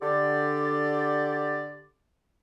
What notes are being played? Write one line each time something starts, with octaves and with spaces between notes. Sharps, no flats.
D3 G4 D5